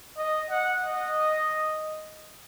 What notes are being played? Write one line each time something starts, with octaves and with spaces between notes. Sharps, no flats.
D#5
F#5
D#5